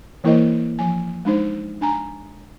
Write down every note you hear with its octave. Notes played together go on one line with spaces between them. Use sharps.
E3 A#3 E4 A#4 C5 D#5
F3 G#5
G#3 D4 D#4 C5
D4 G#5 A#5